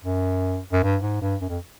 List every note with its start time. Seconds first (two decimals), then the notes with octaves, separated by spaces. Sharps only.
0.04 F#2
0.73 F#2
0.83 G2
1.03 G#2
1.21 G2
1.41 F#2
1.50 F2